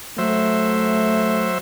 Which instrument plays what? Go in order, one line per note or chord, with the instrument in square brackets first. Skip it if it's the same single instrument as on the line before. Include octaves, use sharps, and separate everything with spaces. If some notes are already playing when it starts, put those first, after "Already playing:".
[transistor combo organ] F#3 C5 E5 [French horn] A3